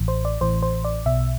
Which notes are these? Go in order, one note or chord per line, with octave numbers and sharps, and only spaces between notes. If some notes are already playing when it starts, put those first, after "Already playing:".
Already playing: A1 A2 E3
C5
D5
A1 A2 E3 C5
C5
D5
B1 B2 E5